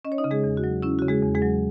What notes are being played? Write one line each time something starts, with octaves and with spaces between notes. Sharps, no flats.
C#4 D#5
C#5
D#4 D#5
C#3
G#3 G#4
E2
F#4
F#3
C#4 E4
C#3 F#4
G#3 G#4
E2
G#3 G#4
F#3